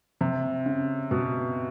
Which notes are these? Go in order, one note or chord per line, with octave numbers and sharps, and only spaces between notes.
C3
C#3
B2